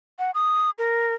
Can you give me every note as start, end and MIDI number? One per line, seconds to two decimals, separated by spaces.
0.19 0.31 78
0.34 0.70 87
0.78 1.14 70